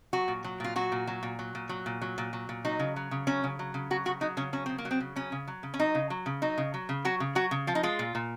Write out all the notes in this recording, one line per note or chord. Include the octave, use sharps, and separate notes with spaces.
F#3 F#4
A#2
F#3
A#2 F4
F#3 F#4
A#2
F#3
A#2
F#3
A#2
F#3
A#2
F#3
A#2
F#3
A#2
F#3 D#4
C#3
F#3
C#3
F#3 C#4
C#3
F#3
C#3
F#3 F#4
C#3 F#4
F#3 D#4
C#3 C#4
F#3 C#4
C#3 C4
A#3
F#3
C4
C#3
F#3 C#4
C#3
F#3
C#3
C#4
F#3 D#4
C#3
F#3
C#3
F#3 D#4
C#3
F#3
C#3
F#3 F#4
C#3
F#3 F#4
C#3
F3 F4
D#4
G#3 F4
A#2
A#2